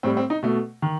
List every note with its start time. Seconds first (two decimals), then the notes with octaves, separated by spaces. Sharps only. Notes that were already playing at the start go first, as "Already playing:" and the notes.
0.03 A2 G3 C4
0.17 C4
0.30 D#4
0.43 B2 A3
0.82 D#3